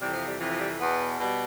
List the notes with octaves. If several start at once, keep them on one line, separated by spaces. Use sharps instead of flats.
F2 C3 E3 G3
F3
G3
F2 C3 E3 F3
F3
G3
E2 B2 B3
B2 G3